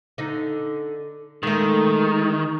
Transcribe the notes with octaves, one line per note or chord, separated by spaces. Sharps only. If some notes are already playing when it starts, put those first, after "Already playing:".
D3 D#4
D#3 G#3 A3